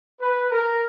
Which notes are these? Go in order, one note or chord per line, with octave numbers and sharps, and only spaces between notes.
B4
A#4